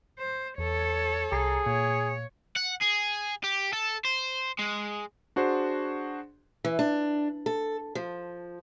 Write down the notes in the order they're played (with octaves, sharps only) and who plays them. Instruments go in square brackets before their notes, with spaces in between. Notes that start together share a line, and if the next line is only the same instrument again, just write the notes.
[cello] C5
[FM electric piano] E2 [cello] A4 C#5
[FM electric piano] C2 A#5 C7 [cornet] G#4
[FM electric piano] A#2 [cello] C#5
[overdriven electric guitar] F#5
G#4
G4
A4
C5
G#3
[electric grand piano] D4 F#4 G#4 C5 C6
[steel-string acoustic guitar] E3
D4
A4
F3